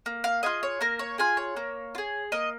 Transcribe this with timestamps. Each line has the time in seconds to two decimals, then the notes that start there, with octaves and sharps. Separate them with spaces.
0.06 A#3
0.24 F5
0.43 F4 G#4 D#5
0.63 C#5
0.81 A#3 A#4
0.99 C#5
1.18 F4 G#4 G#5
1.37 C#5
1.57 A#3
1.95 F4
1.98 G#4
2.32 A#3 D#5